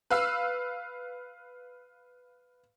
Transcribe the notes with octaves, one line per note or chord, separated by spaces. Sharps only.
B4 F5 E6